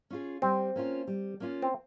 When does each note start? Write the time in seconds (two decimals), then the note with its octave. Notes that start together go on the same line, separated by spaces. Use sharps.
0.10 C#4 F4 G#4
0.42 G3 C4
0.76 A#3 C#4 F4
1.07 G3
1.40 A#3 C#4 F4
1.62 C4